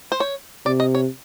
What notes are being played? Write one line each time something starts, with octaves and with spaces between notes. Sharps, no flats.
C5
C#5
C3 D5
D#5
C#5